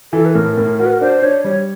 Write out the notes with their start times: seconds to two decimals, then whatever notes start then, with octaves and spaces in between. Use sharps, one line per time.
0.13 E3 A4
0.25 B4
0.35 A2 A#4
0.57 A2 A#4
0.79 F#4 A#4
0.86 B4
0.93 A#4
1.01 D4 C5
1.22 D4 C#5
1.44 G3 C#5